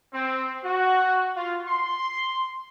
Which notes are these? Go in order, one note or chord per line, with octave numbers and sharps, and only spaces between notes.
C4
F#4
F4
C6